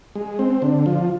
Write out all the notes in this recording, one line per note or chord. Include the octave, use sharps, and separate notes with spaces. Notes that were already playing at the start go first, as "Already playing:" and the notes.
G#3
C4
D3
F3